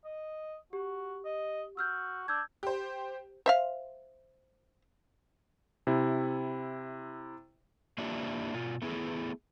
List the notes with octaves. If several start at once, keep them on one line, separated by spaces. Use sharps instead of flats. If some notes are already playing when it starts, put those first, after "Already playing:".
D#5
F#4 G4
D#5
F#4 E6 F6 G6
D4 E6 G6 G#6
G4 C5
C5 E5 F5
C3 E4
A#3 D4 E4 F4 G4
B2 F4
A3 B3 E4 G#4